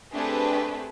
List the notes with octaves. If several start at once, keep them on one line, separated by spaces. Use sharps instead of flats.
A3 C4 D4 G4 G#4 B4